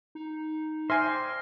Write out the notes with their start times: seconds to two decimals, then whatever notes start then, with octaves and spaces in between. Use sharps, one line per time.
0.15 D#4
0.90 C5 D5 E5 G5 G#5 F6 A#6 C7